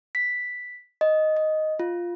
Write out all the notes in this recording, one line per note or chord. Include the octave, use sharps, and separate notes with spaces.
B6
D#5
D#5
F4